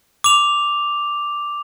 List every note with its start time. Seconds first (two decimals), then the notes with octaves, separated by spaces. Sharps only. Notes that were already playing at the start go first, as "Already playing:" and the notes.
0.24 D6 F7